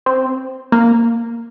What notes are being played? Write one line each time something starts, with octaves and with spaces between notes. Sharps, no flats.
C4
A#3